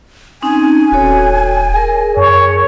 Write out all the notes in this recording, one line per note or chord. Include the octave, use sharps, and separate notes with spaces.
C4 C#4 D#4 G#5
D#1 F#4 A4 C#5
G#4 A#4
F#2 C#5